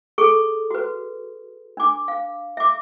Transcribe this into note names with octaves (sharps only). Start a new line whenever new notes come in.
G#4 A4 C#6
F#4 B4
D4 D6
F5
E5 D6